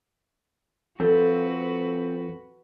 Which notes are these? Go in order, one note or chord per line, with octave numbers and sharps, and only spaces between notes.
F2 C4 F#4 A4 B4